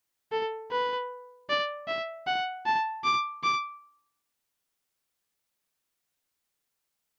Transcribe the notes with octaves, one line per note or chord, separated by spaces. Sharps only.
A4
B4
D5
E5
F#5
A5
D6
D6